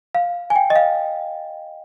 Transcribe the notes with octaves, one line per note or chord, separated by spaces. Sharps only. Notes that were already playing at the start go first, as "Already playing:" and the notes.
F5
G#5
G5
D#5
F5